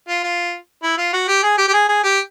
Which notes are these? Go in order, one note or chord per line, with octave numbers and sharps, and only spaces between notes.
F4
F4
E4
F4
F#4
G4
G#4
G4
G4
G#4
G#4
G4